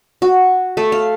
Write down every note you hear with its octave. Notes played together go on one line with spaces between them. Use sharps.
F#4
A3
F5